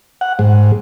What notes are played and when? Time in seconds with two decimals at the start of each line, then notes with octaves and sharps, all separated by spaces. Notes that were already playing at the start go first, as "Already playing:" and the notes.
0.21 F#5
0.39 G#2